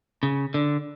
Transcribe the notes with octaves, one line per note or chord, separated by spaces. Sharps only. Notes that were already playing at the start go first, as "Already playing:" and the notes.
C#3
D3